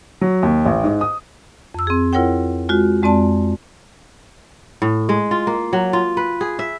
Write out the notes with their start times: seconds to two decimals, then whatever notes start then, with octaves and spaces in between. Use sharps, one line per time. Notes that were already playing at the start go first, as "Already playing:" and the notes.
0.21 F#3
0.43 D#2
0.66 A1
0.84 G#2
1.01 D#6
1.74 F2 E6
1.87 C4 G#4
2.13 E4 F4 A#4 C#5 F#5 G5
2.69 G#3 F4 F#4
3.02 F2 G#3 C4 D5 A5
4.82 A2
5.09 G#3
5.31 F4
5.47 A#3
5.73 F#3
5.93 F4
6.17 B4
6.41 G#4
6.59 E5